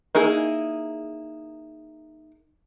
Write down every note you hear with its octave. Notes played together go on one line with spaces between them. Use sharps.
A#3 D#4 E4 G#4